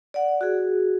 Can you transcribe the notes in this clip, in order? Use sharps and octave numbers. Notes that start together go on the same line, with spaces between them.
D5 F#5
F#4 G#4